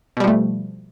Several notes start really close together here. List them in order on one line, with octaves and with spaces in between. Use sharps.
B2 G3 F3 A3